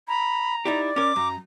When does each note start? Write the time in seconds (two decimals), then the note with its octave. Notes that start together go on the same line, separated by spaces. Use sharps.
0.08 A#5 B5
0.65 D#4 E4 G4 D5
0.96 C#4 A#4 D6
1.16 F#2 A#5